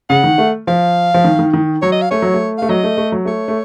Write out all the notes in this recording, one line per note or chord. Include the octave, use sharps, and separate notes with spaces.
C#3 F#5
D#3
A3
F3 F5
F3
D#3
D#3
D#3
F#3 C#5
D#5
F5
A3 C#5
F#3
A3
A3 F5
F#3 D#5
A3
A3
F#3
A3 C#5
A3